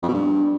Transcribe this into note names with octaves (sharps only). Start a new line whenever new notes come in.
F2
B2
G2